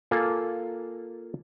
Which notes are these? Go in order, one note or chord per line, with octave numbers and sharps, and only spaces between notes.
A#3 F4 A4 G#5 A5